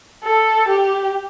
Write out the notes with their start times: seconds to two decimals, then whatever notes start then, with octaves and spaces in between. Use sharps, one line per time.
0.24 A4
0.68 G4